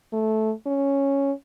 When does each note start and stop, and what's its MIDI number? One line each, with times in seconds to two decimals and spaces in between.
0.13 0.52 57
0.66 1.32 61